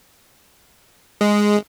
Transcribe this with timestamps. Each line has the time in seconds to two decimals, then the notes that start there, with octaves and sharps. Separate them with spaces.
1.21 G#3